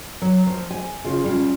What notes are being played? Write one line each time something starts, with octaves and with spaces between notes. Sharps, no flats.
F#3
F3
G#5
C#3 F4
G3 C#4 F4